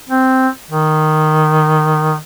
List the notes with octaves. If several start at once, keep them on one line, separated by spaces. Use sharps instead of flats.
C4
D#3